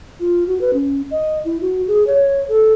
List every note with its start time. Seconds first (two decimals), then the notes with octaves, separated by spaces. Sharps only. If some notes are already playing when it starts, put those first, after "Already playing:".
0.20 F4
0.47 F#4
0.61 B4
0.74 C#4
1.11 D#5
1.45 E4
1.61 F#4
1.88 G#4
2.07 C#5
2.48 A4